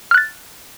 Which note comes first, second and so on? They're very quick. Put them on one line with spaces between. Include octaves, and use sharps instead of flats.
F6 F#6 A6